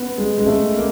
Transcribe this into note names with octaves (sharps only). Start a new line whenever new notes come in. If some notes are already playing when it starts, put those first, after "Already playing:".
Already playing: B3
G#3
G#3
A3
A#3